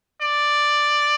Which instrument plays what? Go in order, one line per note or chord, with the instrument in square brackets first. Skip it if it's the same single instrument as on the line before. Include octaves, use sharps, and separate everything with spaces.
[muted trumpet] D5